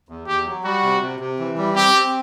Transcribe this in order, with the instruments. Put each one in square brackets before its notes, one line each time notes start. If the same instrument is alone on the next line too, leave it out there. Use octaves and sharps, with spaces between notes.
[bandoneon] E2
[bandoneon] E2 [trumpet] G4
[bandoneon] F#3
[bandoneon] G3 [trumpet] F#4
[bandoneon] C3
C3
C3
E3
G3
[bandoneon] C4 [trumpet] G4
[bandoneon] C4